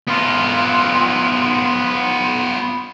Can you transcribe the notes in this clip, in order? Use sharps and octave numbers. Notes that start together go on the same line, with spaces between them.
B3 F4